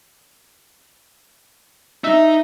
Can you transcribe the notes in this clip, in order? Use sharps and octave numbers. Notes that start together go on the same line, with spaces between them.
D#4 E5